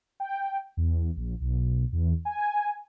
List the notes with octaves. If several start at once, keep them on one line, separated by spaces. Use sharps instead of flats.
G5
E2
A#1
B1
E2
G#5